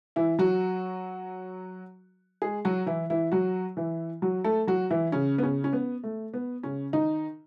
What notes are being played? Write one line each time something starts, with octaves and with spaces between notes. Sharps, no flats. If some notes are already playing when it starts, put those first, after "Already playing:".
E3 E4
F#3 F#4
G#3 G#4
F#3 F#4
E3 E4
E3 E4
F#3 F#4
E3 E4
F#3 F#4
A3 A4
F#3 F#4
E3 E4
C#3 C#4
B3
C#3 C#4
C#4
B3
A3
B3
C#3 C#4
D#3 D#4